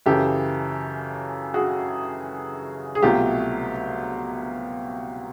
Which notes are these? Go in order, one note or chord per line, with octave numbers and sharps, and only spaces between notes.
F#2 C#3 E3 G4 A4
F#4 G#4
G#4
C2 B2 F#3 A3 F4 G4